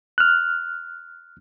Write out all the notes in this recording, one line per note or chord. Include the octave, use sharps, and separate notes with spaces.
F6 F#6